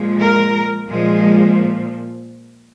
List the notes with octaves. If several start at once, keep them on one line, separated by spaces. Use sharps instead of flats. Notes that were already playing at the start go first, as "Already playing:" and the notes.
Already playing: A#2 F3 G#3
A#4
A#2 F3 G#3